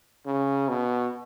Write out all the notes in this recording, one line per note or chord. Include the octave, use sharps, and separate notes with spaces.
C#3
B2